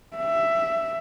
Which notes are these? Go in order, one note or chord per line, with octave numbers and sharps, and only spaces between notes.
E5